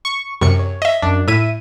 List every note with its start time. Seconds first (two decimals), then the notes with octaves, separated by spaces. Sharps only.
0.05 C#6
0.41 F#2 C3 C#6 C#7
0.59 C#5
0.82 D#5 E5
1.02 F#2 D4
1.28 A2 E4 E5 D#7